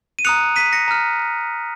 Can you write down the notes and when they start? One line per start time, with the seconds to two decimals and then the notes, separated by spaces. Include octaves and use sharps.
0.19 D#7
0.25 A#5 D#6 F#6 C#7 F7
0.56 B6 D#7
0.73 A#6 C#7
0.88 A#5 F6